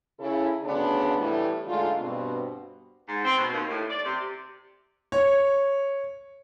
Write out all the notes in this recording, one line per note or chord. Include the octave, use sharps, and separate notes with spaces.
C#3 E4 A4
D2 C#3 F3 B3 D4
A2 E3 G3 A3
G#2 D3 A3 F4
G2 B2 C4
G#2
C4
B2
D#2
A2
D5
C3
C#5